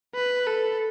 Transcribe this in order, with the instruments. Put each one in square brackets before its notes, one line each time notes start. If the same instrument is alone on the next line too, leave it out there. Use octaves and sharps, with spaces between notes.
[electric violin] B4
A4